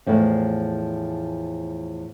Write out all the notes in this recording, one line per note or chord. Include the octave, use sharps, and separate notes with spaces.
E2 A2 F3